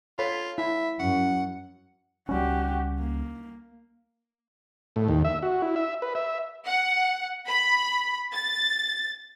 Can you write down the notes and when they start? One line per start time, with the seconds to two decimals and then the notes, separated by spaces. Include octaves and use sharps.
0.19 F4 A4 C#5 B5
0.58 E4 E5 B5
0.99 F#2 C#4 F#5
2.29 C#2 G3 C#4 F#4 G4
2.99 A#3
4.96 A2
5.08 D#2
5.24 E5
5.43 F#4
5.62 E4
5.76 E5
6.02 B4
6.15 E5
6.66 F#5
7.48 B5
8.33 A6